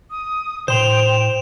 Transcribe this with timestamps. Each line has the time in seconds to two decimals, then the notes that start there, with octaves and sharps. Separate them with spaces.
0.11 D#6
0.68 A2 C5 G5 C6 E7 F7